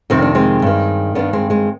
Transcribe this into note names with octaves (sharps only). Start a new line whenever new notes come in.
F2 C3 D#3 C4
D4
G#3 C4
G2 D#3
G2 D#3 B3 D4
G#3 C4
G#3 C4